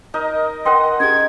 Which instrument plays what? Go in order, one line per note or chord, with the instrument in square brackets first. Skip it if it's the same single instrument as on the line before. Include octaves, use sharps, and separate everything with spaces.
[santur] D#4 A#4 D#5
[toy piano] A#4 G5 C6 [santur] D#5 F#5
[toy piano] C#4 G4 G#4 [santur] G5 [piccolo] G#6